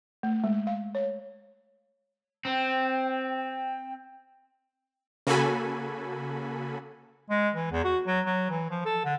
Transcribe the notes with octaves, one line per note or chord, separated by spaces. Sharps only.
A3
G#3
F5
C#5
C4 G5
G5
C#3 A#3 F#4 A4 G#5 B5
G#3
E3
E2
F#4
F#3
F#3
E3
F3
A4
D3